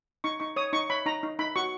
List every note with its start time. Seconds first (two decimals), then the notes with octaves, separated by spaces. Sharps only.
0.24 D#4 C#6
0.40 D#4 C#6
0.56 C#5 D#6
0.73 D#4 C#6
0.90 C#5 B5
1.06 D#4 A#5
1.23 D#4
1.39 D#4 B5
1.56 F#4 C#6